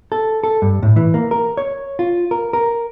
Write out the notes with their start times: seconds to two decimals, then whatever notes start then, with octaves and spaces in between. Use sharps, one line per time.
0.12 A4
0.44 A4
0.62 G2
0.83 A2
0.96 E3
1.14 A#3
1.31 A#4
1.57 C#5
1.99 F4
2.31 A#4
2.53 A#4